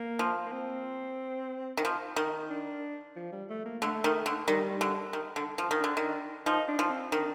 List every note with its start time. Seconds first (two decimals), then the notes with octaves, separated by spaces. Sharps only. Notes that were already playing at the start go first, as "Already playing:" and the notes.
Already playing: A#3
0.19 F3
0.46 A#3
0.52 C4
1.77 D#3
1.85 F3
2.16 D#3
2.50 D4
3.16 F3
3.32 G3
3.50 A3
3.66 A#3
3.82 D3 A3
4.04 D#3
4.26 D3
4.48 D#3 G3
4.81 D3
5.13 D#3
5.36 D3
5.58 F3
5.71 D#3
5.80 D3 D4
5.97 D#3
6.46 F3 D#4
6.68 D4
6.79 F3
6.89 C4
7.12 D#3 D4